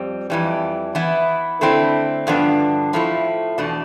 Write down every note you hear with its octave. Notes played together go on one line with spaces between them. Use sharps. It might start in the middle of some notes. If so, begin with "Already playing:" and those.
Already playing: F2 G3 C4
F2 E3 G3
E3 B3 E4
D3 A3 C4 E4
G2 D3 F3 B3 D4
A2 F3 A3 E4
E2 B2 A3 D4